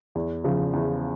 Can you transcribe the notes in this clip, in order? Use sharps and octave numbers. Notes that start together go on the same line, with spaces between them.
E2
C#3 F3
E2